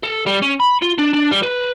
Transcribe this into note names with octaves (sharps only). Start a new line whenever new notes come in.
A4
G3
C#4
B5
F4
D4
D4
G3
B4